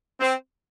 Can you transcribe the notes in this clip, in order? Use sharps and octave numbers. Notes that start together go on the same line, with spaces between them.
C4